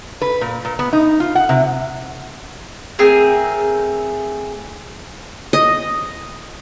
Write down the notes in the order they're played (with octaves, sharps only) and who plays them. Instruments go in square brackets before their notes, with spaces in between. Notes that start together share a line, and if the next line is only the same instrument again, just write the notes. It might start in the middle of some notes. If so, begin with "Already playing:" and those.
[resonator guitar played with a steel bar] B4
A#2
A#2
B3
D#4
F4
F#5
C3
[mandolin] A3 C4 G#4 A#4
[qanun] D#5